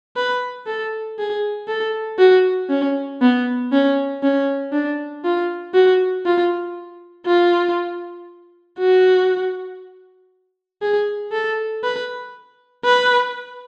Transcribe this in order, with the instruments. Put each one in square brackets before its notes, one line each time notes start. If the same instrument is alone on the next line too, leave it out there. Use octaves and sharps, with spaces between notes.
[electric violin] B4
A4
G#4
A4
F#4
C#4
B3
C#4
C#4
D4
F4
F#4
F4
F4
F#4
G#4
A4
B4
B4